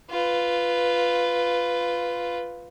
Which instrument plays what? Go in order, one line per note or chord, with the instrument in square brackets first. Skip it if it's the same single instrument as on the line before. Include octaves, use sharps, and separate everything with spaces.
[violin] F4 B4